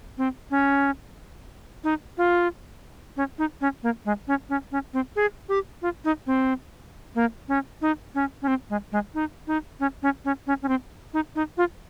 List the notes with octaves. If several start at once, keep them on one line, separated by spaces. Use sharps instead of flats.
C4
C#4
D#4
F4
C#4
D#4
C#4
A#3
G#3
C#4
C#4
C#4
C4
G#4
G4
F4
D#4
C4
A#3
C#4
D#4
C#4
C#4
C4
G#3
G#3
D#4
D#4
C#4
C#4
C#4
C#4
C#4
C4
D#4
D#4
F4